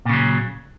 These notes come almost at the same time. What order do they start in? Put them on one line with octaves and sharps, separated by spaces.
A#2 C#3 F#3